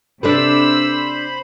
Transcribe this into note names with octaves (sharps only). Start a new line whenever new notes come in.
C3 D4 A4 B4 C5 B5 E6